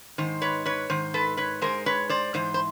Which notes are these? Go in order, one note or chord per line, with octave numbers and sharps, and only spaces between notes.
G#2 D#3 C5
B4 C#5
B4 C#5
G#2 D#3 C5
A4 B4
B4 C#5
G#2 E3 G#3 A#4 C5
B4 C#5
C5 D5
G#2 E3 C5
C5